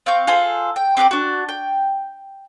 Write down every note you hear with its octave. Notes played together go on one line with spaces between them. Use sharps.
C4 F5 C#6 G6
F4 G#4 A4 C5
G5
C4 G4 B4 D6
D4 F#4
G5